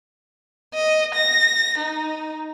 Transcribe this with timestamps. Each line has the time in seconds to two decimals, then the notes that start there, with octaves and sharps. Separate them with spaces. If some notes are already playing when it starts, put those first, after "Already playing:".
0.74 D#5
1.15 A#6
1.78 D#4